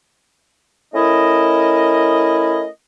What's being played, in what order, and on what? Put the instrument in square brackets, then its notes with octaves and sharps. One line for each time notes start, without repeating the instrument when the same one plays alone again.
[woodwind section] A3 C#4 E4 A#4 D#5